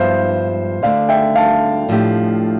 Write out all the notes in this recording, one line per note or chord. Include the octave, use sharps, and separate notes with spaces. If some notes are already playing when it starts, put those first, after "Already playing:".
Already playing: G2 F3 B3 C5 E5 F5
D2 D3 A3 D5 F5
E5 G5
F5 A5
A2 F3 A3 D4 G4